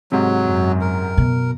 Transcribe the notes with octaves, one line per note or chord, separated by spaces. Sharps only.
G#2 C3 F#3
F#2
A#4
B2